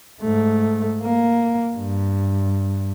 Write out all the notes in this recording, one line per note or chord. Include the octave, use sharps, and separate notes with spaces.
G#2 A3
A#3
G2